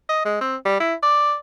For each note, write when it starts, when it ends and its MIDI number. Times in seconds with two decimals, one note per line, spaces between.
0.09 0.24 75
0.25 0.39 56
0.41 0.56 60
0.65 0.78 55
0.80 0.94 64
1.03 1.34 74